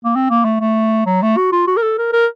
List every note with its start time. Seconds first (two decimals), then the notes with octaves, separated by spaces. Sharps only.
0.05 A#3
0.15 C4
0.30 A#3
0.45 A3
0.61 A3
1.06 F#3
1.22 A3
1.37 F#4
1.52 F4
1.67 F#4
1.77 A#4
1.82 A4
1.98 A#4
2.13 A#4